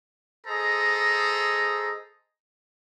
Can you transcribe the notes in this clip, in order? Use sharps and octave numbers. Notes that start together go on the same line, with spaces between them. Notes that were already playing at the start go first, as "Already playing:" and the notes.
G#4 A4 C5 D#5 A#5